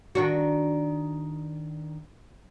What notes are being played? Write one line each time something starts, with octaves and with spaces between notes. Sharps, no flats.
D#3 D4 F#4